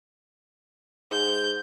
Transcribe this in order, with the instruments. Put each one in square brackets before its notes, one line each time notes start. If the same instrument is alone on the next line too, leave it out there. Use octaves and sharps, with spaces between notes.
[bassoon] G#2 [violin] G6